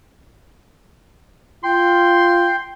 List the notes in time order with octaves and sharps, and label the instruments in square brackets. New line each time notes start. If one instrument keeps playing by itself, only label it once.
[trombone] F4 [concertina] G5 [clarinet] C6